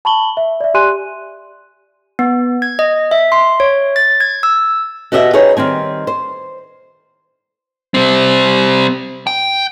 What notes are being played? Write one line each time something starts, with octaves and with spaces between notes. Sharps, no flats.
A5 B5 C#6 F#7 G7
E5
D5 E5
G4 D5 G#5 C6 F#6 D#7
B3
G#6
D#5
E5
C6
C#5
A6
G#6
E6
B2 F#4 G4 D#5 E5 F#5
D#4 G#4 B4 C#5 G5
D#3 G3 C4 G#5
C5
G3 C4
G5